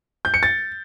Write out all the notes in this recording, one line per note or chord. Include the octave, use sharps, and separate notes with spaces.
G6
C#7
A6